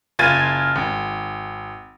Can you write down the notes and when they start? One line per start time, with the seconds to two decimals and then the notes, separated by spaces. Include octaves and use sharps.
0.19 F#1 F4 G#6 A6 D#7
0.76 G#1